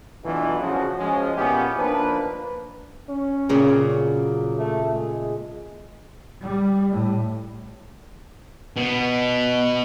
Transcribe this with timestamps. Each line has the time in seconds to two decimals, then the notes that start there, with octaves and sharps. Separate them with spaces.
0.24 B2 E3 F#3 A3 D4 F4
0.61 C#3 F3 F#4
0.98 F3 G#3 C#4
1.36 A#2 B3 C#4 E4 F4 G4
1.77 F3 A#3 D4 D#4 B4
3.09 C#4
3.49 A#2 C#3 A#3
3.96 F#3
4.58 A3
4.94 G#3
6.42 G3
6.90 A2
8.76 B2 B3